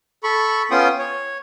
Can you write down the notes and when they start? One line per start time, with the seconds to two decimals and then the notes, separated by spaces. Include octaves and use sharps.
0.23 A4 B5 C#6
0.71 B3 C#4 F4 G5 C6 D#6
0.99 C#5